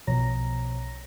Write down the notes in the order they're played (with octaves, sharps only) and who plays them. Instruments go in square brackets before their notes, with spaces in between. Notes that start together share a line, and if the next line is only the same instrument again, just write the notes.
[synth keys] B1 B2 F3 C#5 A#5 A#6